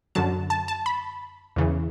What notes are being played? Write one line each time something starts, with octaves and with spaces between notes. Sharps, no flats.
F#2 D3 F#3 A5
A5
A5
B5
E2 C#3 E3